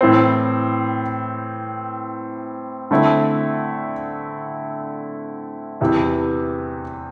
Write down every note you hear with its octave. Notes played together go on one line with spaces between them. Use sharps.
A2 E3 C4
D3 A3 C4 E4
E2 C3 E3